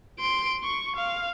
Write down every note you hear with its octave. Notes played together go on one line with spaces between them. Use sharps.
C6 D7
C#6
F5